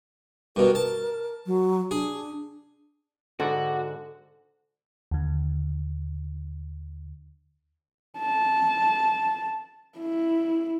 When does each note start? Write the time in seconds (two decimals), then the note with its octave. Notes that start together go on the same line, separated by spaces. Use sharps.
0.56 G2 B2 A#4
0.75 A5
1.46 F#3
1.91 D4 G#4
3.40 G#2 D3 F#4 A4 D5
5.11 D#2 D3
8.19 A5
9.98 E4